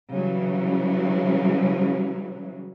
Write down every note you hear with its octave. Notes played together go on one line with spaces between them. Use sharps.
C#3 E3 F#3 G3